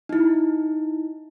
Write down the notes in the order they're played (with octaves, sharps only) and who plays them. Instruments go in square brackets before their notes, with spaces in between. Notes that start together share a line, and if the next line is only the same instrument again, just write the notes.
[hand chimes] D#4 E4